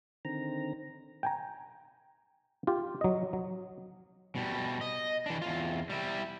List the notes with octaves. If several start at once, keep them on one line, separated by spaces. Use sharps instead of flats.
D3 D#3 C4 A#5
G5 G#5 A#5
F4 G4
F#3 D#5
F#3
B2 G3
D#5
E3 D4
E2 F4
G3 E4